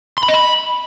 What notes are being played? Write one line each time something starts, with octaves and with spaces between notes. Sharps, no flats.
C6
B5
D#5
B5